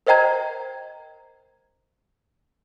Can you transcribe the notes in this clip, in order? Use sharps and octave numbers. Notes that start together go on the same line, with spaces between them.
A#4 C5 D#5 G5 A#5 G#6